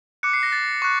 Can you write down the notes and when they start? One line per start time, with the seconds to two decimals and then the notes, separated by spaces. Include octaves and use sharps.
0.23 D6 F#6 C#7
0.33 C7
0.43 A#6
0.52 A6
0.82 C#6 F#6